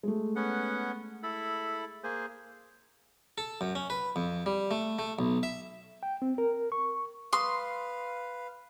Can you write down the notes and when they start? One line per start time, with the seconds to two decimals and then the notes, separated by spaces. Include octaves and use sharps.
0.03 G#3 A3
0.36 B3 C#4 F#5
1.23 E4 A4 B5
2.04 A#3 G#4 C5
3.38 A4
3.61 F#2
3.75 C#4
3.90 B4
4.16 F2
4.46 G3
4.71 A3
4.99 A3
5.19 B1
5.43 E5
6.03 G5
6.22 C4
6.38 A#4
6.72 C#6
7.33 B4 F5 C6 C#6 D#6